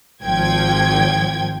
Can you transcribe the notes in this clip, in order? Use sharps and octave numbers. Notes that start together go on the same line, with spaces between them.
G#1 F3 G5 G#6